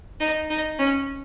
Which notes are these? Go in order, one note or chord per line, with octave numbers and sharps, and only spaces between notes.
D#4
D#4
C#4